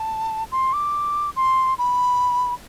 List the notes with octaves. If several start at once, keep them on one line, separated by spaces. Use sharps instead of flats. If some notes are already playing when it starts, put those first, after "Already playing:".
Already playing: A5
C6
D6
C6
B5